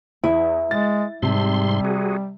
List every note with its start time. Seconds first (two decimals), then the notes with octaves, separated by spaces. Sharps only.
0.24 E2 E4
0.71 G#3 A6
1.22 G#2 C3 G3 A5 C6
1.85 F#4 G#4